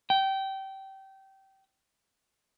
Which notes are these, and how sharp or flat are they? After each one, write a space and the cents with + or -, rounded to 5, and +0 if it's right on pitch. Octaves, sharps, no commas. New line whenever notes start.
G5 -20